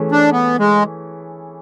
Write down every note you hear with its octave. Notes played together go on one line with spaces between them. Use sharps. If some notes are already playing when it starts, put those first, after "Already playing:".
Already playing: E3 A3 C#4 G#4
D4
B3
G#3